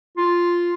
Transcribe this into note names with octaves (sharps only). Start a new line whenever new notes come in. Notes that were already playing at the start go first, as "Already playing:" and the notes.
F4